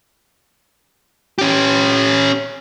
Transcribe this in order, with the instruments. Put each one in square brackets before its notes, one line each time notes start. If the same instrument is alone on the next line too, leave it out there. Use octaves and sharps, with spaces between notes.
[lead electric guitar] C#4 G4